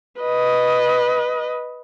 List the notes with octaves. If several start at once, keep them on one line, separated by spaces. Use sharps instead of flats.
B4 D#5